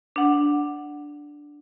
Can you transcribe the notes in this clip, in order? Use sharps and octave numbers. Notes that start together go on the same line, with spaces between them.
D4 F#5